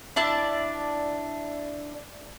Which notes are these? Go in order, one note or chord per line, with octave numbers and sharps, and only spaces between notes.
D4 E4 D5 A5